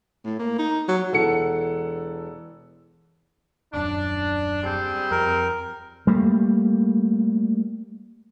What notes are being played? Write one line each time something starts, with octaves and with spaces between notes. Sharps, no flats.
A2
A#3
D#4
F#3
E1 E3 A4 F#5 C#7
D#1 F#2 D4
G3 C4 G#4
F2 A#4
G3 A3 A#3